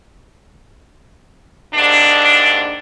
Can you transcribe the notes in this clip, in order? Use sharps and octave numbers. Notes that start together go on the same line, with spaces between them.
D#2 G#2 D4